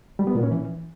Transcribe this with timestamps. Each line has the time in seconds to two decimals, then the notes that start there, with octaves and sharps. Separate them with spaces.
0.19 G3
0.27 B3
0.35 A#2
0.43 C#4
0.51 E3